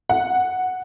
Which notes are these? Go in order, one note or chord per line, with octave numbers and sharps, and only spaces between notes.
F#5